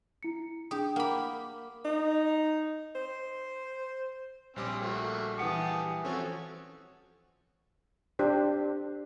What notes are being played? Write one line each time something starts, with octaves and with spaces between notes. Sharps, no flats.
E4 C#7
D4 G4 G#4 D#6
A#3 F#5 B5 D6
D#4
C5
A#1 G3 C4 C#4 D6
A3 A#3 F#4
E3 G4 F#5 A5 D#6 C#7
F3 C4 C#4 F#4 A4 C#5
D4 G4 C5